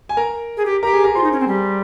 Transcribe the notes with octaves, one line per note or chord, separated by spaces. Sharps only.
G#5
A#4 A#5
G#4
G4
G4 A#4 A#5
G#4 G#5
A#4 A#5
F4 C5 C6
D#4
C#4
C4
G3